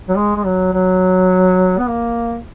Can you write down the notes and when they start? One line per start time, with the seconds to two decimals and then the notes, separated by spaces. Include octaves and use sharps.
0.09 F#3
0.17 G#3
0.36 G#3
0.46 F#3
0.73 F#3
1.79 B3
1.88 A#3